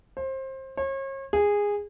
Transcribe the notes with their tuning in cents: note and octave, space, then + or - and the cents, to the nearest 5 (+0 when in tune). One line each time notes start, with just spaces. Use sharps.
C5 +25
C#5 -40
G#4 -15